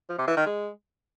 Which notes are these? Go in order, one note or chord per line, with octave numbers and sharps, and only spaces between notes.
F3
C3
E3
D#3
G#3